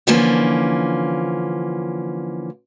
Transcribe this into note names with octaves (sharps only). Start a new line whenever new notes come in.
D3 E3 F3 A#3 C#4